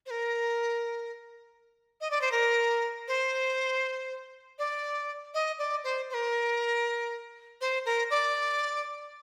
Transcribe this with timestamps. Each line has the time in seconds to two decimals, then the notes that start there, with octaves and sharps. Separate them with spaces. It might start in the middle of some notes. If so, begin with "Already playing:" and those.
0.06 C5
0.10 A#4
2.01 D#5
2.11 D5
2.21 C5
2.32 A#4
3.08 C5
4.59 D5
5.34 D#5
5.59 D5
5.84 C5
6.10 C5
6.14 A#4
7.61 C5
7.86 A#4
8.10 D5